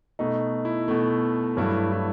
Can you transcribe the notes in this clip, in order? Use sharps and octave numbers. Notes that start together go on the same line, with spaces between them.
B2 A3 D#4
E4
B2 A3
G2 F#3 A3 E4
E4